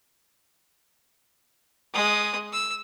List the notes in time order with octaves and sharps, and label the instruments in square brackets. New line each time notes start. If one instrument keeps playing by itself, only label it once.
[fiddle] G#3 D#6
E6